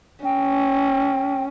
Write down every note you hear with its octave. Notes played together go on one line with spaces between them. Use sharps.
C#4 G5